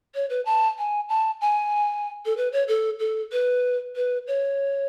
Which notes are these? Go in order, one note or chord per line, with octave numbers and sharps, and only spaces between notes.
C#5
B4
A5
G#5
A5
G#5
A4
B4
C#5
A4
A4
B4
B4
C#5